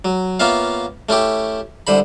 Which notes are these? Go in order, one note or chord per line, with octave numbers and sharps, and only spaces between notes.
F#3
A#3 B3 C#4 F4 E5 F5
A3 C#4 E4 G4
C2 D3 C5 B5